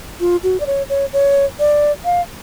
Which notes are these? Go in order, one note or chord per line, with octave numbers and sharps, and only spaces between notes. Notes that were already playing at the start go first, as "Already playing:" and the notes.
F4
F#4
D5
C#5
C#5
C#5
D5
F5